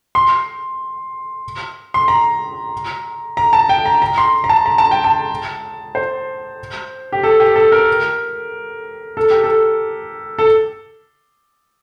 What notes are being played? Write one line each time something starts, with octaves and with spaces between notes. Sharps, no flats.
C6
C6
A#5
A#5
A5
G5
A#5
A#5
C6
A#5
A5
A#5
A5
G5
A5
C5
G4
A4
G4
A4
A#4
A4
G4
A4
A4